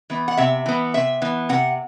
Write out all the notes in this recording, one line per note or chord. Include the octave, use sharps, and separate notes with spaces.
E3 B3
F#5
C3 E5
E3 B3
C3 E5
E3 B3
C3 F#5